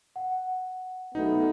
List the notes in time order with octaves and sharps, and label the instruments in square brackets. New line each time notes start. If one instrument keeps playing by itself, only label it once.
[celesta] F#5
[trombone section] B1 A3 B3 [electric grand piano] D#4